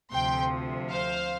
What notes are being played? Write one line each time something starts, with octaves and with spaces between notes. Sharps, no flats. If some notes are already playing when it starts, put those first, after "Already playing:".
D2 C3 F3 G5 C6
C5 F5